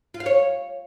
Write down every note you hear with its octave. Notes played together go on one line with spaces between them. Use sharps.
F4
F5
C#5